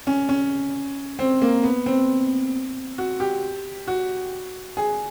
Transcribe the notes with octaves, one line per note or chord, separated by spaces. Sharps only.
C#4
C#4
C4
A#3
B3
C4
F#4
G4
F#4
G#4